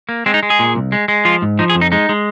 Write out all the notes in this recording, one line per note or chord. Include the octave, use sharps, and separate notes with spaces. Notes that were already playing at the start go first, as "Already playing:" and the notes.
A#3
G#3 C4
D#4
G#3
G#4
A#2
C2
G#3
G#3
F3 F4
G#2
F3 D#4
G#4
F2
D#4
G#3 D#4
G#3